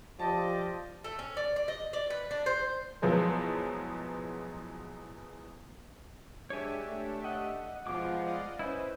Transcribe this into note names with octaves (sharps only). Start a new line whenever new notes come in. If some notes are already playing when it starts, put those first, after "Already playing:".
F3 G4 D5 D#5 A5
A3
C#4
D5
D5
D#5
D5
B4
D4
C5
E2 B2 F3 F#3 G#3
G#3 D4 G4 C#5 E5 G#5
A3
D#5 F#5
B2 F3 G#3 B3 F4 D6
D5 D#5 F5
C#4 E4 B4 C5 D#5